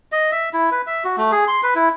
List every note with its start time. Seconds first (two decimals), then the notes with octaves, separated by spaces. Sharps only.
0.12 D#5
0.31 E5
0.53 E4
0.72 B4
0.87 E5
1.04 F#4
1.17 A3
1.32 G#4
1.48 C6
1.63 B4
1.75 E4